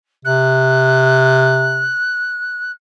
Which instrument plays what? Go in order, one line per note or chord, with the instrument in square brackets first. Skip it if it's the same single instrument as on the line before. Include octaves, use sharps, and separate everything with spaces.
[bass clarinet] C3 [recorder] F#6